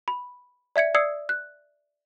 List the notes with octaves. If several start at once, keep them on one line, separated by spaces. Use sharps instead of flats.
B5
D5 E5 G#6 C#7
D5 D#6 E6 G#6 C7 C#7
F#6